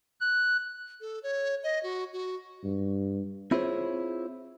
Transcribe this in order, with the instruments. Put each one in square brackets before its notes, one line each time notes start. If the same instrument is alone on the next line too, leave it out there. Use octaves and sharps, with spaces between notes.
[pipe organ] F#6
[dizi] A4
C#5
D#5
F#4
F#4
[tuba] G2
[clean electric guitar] C4 E4 F4 G#4 C5 C#5